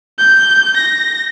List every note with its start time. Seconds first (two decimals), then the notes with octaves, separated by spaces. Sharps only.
0.19 G6
0.77 A#6